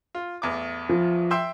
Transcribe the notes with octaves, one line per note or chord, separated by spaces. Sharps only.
F4
A1 E2 D6
F3
E5 G5 C6